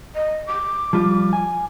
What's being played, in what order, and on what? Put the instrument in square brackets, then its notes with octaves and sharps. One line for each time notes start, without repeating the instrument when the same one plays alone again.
[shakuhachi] D#5
D6
[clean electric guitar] F3 G3 F4
G#5